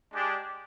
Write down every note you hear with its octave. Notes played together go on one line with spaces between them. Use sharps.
G#3 D4 G4